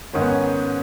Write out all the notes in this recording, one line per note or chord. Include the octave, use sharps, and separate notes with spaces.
G#2 D#3 C#4
B3
C#4